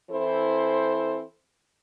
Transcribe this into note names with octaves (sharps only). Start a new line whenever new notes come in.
E3 C4 E4 A4 C5